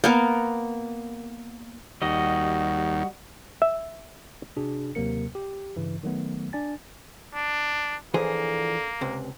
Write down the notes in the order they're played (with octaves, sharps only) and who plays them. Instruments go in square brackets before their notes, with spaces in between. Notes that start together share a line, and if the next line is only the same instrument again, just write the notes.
[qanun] A#3 B3 A#4
[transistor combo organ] D#2 [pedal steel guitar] G3 F#4 D#5
[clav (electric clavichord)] E5
[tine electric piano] C3 D4 F#4 G#4
D#2 C3 F#3 A#3 A#4 C#7
G4
G2 C#3 E3
D#3 F#3 A3 B3
D4 D5 G#5 A6
[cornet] D4
[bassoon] D3 [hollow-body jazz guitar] E3 F3 G#4 [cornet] A#3
[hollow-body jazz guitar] C#2 C3